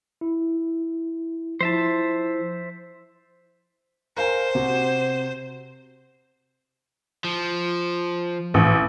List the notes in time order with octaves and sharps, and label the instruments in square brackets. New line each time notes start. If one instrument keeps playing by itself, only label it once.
[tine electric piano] E4
[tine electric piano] F3 E4 [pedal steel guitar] C5 E5 A5
[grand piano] A#4 F5 G#5 [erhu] C5
[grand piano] C3 F#4
[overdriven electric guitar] F3
[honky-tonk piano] A1